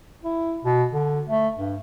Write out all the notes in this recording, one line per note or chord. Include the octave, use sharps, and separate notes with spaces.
E4
B2
D3
A3
G2